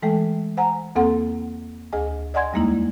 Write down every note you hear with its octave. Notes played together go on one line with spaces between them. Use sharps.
E3 G#3 A3 A4 G5
C5 F#5 G#5 A#5
E2 A#3 C4 A4 F#5 C6
D2 G#4 D#5 G#5
D5 D#5 F#5 G#5 C6 G#6
E2 G3 G#3 A#3 D#4 E4